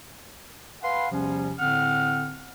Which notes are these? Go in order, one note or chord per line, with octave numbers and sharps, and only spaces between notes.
B4 F5 F#5 G#5 B5 C6
E2 C3 F3 G3 C#4
A2 D3 C4 F#5 F6